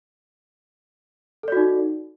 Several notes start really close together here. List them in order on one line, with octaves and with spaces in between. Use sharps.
A4 D5 F#4 D#4